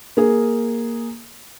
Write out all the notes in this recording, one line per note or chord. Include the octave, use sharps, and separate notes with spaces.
A#3 G#4